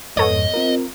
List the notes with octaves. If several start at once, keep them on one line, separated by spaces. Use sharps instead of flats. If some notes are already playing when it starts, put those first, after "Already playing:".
F2 G#2 B3 A4 C#5 D#5
C4 F4 A#4